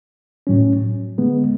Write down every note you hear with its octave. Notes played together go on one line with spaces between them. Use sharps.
A2 F#3 C#4
D3 G#3 B3